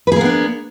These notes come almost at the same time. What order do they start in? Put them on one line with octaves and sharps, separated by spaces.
B4 G#4 A#3 B3 D4